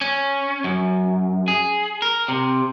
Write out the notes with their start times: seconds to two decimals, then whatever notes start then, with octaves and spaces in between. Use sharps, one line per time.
0.01 C#4
0.64 F#2
1.48 G#4
2.02 A#4
2.28 C3